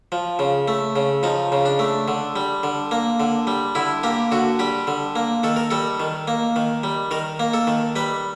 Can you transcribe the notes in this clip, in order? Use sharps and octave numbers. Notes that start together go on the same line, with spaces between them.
F3
C#3
A3
C#3
F3 D#4
C#3
D4
A3
D3
G3
D3
A#3
D3
G3
D3 E4
A#3 G4
D3 F#4
G3 G4
D3
A#3
D#3 A4
A#4
G3 A4
D#3
A#3
D#3
G3
D#3 A#4
A#3
A4
D#3
G3 B4